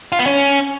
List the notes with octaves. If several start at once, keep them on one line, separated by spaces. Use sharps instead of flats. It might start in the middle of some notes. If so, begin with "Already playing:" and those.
F4
B3
C#4